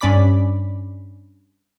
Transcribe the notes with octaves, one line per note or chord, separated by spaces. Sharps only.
G2 C#4 D5 B5 D6 B6